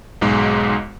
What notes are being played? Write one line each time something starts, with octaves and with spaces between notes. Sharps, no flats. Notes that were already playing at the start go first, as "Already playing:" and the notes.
B1 G#2 G#3